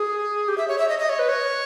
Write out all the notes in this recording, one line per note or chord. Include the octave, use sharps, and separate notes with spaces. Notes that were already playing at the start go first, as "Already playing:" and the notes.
Already playing: G#4
G4
E5
C#5
E5
D#5
D#5
C#5
B4
C#5